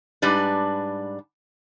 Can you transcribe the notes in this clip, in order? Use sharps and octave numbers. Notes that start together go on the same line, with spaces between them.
G#2 G3 D4 B4